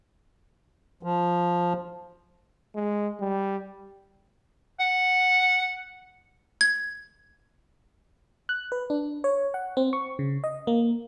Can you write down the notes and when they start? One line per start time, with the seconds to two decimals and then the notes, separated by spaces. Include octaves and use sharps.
1.03 F3
2.76 G#3
3.21 G3
4.80 F#5
6.61 G#6
8.49 F#6
8.72 B4
8.90 D4
9.24 C#5
9.54 F#5
9.77 C4
9.93 C#6
10.19 C#3
10.44 D#5
10.67 A#3